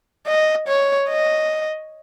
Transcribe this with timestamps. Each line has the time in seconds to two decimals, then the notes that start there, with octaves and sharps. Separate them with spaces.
0.27 D#5
0.67 C#5
1.08 D#5